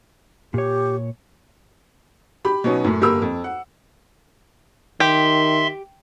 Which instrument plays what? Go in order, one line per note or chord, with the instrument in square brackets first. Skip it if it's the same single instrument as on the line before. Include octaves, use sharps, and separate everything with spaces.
[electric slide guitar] A#2 C#5 [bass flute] G4
[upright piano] G4 B5
B2 F#3 B3 C#4 D#4
F#2 A2
G1 A#3 G4 A#4 B5 E6
F2
F#5
[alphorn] D#3 [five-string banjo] G4 [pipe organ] E5 C6